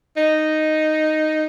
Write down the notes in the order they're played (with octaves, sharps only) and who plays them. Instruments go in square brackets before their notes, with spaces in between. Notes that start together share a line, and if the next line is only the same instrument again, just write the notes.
[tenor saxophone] D#4